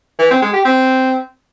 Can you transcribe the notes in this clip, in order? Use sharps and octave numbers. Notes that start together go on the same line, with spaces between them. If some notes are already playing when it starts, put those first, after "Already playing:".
E3
C4
G#3
G4
C4